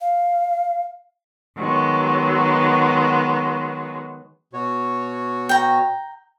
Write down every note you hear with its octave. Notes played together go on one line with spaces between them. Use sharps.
F5
D#3 F#3 G#3 B3
B2 F#4 C#5
G5 A#5